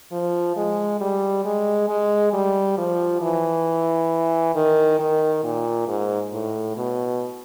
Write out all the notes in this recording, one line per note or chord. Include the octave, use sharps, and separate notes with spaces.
F3
G#3
G3
G#3
G#3
G3
F3
E3
D#3
D#3
A#2
G#2
A2
B2